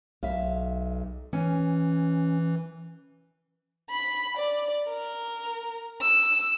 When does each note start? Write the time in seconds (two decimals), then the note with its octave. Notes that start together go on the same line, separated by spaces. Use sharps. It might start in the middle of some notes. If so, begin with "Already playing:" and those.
0.23 B1 E5 F5
1.33 E3 C#4
3.90 B5
4.37 D5
4.89 A#4
6.01 E6